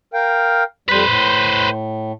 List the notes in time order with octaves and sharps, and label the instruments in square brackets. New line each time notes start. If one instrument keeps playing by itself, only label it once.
[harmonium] A#4 F5 G5
[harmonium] F2 G3 [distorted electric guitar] B4 C5
[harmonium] A2